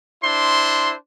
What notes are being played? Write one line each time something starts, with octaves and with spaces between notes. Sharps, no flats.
D4 E4 C5 C6